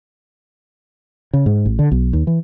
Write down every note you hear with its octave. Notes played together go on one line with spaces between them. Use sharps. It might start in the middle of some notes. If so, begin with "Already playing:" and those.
C#3
G#2
A1
D3
B1
D#2
E3